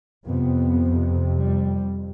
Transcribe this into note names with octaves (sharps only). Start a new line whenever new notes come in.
F2 C3 B3
G3